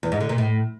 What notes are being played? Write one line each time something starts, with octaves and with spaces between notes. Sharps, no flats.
E2
G#2
D3
A#2
A2